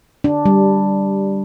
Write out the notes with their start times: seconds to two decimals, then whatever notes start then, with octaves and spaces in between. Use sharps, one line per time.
0.24 D4
0.45 G3